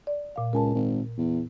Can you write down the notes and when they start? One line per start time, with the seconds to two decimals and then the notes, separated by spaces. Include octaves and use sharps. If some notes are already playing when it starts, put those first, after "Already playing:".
0.07 D5
0.36 A#2 F5
0.53 C#2 A#4 G#5 A5
0.75 G#1
1.17 E2